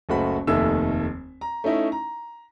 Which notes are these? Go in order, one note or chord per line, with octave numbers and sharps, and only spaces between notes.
F#1 C#2 A3 F#4 C5 B5
F1 D#2 D#3 A3 E5 E6
A#5
A3 C#4 D#4 E4
A#5